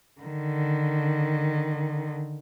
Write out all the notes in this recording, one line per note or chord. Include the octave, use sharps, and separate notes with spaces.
D3 D#3